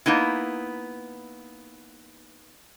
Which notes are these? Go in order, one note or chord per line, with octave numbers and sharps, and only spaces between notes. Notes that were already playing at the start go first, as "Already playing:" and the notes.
A#3 B3 D#4 E4